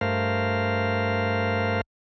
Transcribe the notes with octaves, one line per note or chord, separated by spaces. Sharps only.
G2 A3 A#4 C5 F5